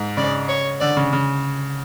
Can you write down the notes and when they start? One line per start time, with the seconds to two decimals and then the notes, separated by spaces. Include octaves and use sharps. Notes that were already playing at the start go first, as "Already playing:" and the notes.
Already playing: G#2
0.17 C#3 D5
0.49 C#5
0.80 D3 D5
0.97 C#3
1.13 C#3